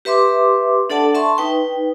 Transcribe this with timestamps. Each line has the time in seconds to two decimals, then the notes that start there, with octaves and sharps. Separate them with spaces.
0.05 G4 B4 E5 C6 D6
0.90 D4 A4 D5 F#5 A5
1.15 E5 A5 C6 C#6
1.38 D#4 B4 G5